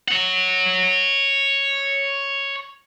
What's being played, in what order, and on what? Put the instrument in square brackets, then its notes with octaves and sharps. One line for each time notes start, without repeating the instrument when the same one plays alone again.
[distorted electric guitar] C#5 F#5